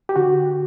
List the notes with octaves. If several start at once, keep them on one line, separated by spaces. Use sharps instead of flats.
G4
D3 F#4